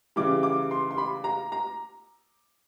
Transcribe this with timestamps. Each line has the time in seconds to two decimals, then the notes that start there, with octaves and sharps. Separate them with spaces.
0.16 C#3 E3 G3 D6
0.43 D6
0.71 C6
0.91 C6
0.98 B5
1.24 A#5
1.52 A#5